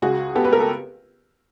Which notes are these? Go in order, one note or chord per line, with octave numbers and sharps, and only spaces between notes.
C#2 F#4 G#4
B3 G4 A4
B4
A#4
A4